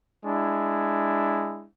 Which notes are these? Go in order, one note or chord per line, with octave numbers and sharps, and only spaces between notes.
G#3 D4 E4